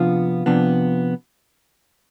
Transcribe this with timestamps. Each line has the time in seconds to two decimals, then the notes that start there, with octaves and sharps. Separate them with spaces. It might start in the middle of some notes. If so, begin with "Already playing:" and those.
Already playing: C3 F3 B3 D4 F4
0.46 C3 F3 B3 D4